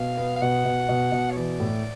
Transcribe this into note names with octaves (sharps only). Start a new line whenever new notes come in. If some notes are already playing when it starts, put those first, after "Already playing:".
Already playing: B2 F5
B3
F5
B2 F#5
B2
B2
B2
C#5
E3 D5
A2